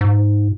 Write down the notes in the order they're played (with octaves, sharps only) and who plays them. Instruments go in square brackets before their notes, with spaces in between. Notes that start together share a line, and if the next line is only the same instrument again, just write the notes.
[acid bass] G#2